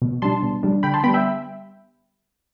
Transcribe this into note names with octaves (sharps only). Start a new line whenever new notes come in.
B2
G3 D4 A5 C6
B2
G3 D4
D3 G5 B5
A5 C6
G3 B3 G5 B5
E5 G5